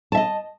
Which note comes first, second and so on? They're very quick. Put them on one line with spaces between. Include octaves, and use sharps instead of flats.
A5 E5 D#5